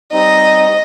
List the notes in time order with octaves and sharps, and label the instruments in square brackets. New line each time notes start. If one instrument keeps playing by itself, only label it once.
[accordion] G3 C4 D#4 [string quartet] D#5